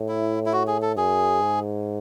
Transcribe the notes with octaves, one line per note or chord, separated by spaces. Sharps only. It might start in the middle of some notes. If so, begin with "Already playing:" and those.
Already playing: A2
E4
E4
F#4
G#4
A4
F#2 G#4
G#2